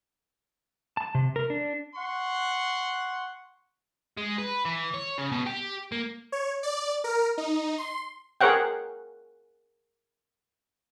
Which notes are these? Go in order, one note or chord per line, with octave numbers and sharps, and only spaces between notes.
A5
C3
A#4
D4
F#5 C6 C#6
G#3
B4
E3
C#5
C#3
B2
G4
A#3
C#5
D5
A#4
D#4
C6
G#4 A#4 C5 C#5 F#5 G5